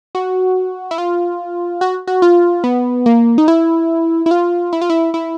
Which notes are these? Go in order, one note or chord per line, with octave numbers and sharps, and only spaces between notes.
F#4
E4
F4
F#4
F#4
F4
B3
A#3
D#4
E4
E4
F4
E4
F4
E4
E4